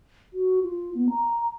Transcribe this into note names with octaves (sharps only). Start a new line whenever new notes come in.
F#4
F4
B3
A#5